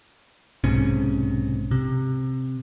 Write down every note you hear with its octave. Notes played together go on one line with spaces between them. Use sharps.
B1 G#2 C3 C#4
C3